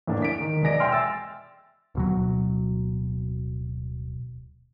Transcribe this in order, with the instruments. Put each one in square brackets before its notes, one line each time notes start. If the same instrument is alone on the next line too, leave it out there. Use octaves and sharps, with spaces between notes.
[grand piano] E2 A2 G#3 A#3 D4
B6 D7
D#3
E1 G#3 D5 A#6 D7
E5 G5 G#5 C6 F6
E6 A6
[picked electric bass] D1 B2 F#3